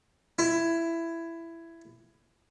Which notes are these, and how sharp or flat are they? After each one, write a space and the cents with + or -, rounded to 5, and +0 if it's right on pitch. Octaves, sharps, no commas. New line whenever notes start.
E4 +15